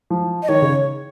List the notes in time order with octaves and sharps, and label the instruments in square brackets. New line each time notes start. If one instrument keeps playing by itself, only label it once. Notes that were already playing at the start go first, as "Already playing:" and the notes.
[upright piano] F3
[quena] D#5
[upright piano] D#3 [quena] C#5
[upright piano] C#3